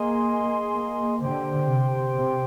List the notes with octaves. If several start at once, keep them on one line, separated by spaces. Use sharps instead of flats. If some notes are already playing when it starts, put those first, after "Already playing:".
Already playing: A#3 G#4 D#5 G#5 C6
A#3
D3 G4 C5 G5 C6
C3
C3